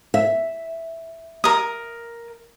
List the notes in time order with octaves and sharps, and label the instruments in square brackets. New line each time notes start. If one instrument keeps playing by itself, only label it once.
[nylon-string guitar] E5
[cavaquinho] A#4 D#6